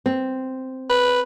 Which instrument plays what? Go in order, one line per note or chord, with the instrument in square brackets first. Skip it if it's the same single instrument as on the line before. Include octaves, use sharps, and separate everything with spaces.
[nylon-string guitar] C4
[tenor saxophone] B4